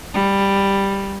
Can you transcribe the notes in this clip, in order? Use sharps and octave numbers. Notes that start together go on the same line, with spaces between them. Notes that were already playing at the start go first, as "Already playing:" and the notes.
G3